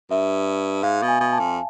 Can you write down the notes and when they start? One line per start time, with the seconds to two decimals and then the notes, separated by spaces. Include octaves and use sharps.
0.10 G2 E5
0.83 G#2 F5
1.02 B2
1.08 G#5
1.21 B2
1.33 A5
1.39 F2